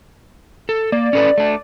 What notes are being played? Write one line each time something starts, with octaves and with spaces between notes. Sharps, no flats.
A4
A#3 D5
C#4 A4 B4
A3 D4